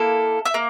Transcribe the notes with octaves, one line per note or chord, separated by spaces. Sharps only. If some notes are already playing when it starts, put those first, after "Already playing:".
Already playing: A#3 E4 A4
E5
A#3